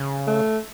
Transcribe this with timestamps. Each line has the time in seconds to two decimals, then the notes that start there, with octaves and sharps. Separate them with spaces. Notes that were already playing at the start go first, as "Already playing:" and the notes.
Already playing: C#3
0.27 A3